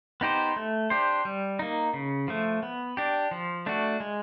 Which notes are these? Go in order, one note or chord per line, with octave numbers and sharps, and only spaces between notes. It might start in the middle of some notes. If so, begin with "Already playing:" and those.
B3 D#4 G4 C5
A3
D4 G4 C5
G3
A#3 D#4
C#3
F3 A3
B3
D4 G4
F3
A3 D4 F#4
G#3